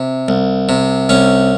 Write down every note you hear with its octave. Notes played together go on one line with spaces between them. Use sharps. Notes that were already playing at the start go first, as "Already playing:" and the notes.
Already playing: C3
C2
C3
C2 C#4